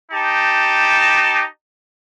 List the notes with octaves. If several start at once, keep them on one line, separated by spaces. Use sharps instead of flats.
D#4 G4 A5